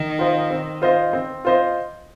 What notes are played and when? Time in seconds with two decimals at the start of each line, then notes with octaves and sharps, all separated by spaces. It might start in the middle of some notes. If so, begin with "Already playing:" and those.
Already playing: D#3
0.19 F4 C5 D#5
0.50 C4
0.82 F4 C5 D#5
1.13 C4
1.45 F4 C5 D#5